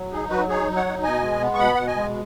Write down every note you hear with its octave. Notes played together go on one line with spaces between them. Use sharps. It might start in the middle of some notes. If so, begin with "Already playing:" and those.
Already playing: F#3
D#4 G#4
F#3 F#4 B4
D#4 G#4 C#5
F#3
C#5 F#5
D#4
B2 D#5 G#5
G#3
B3
C#6
B2 F#5 B5
B2 F#5
D#5 G#5
G#3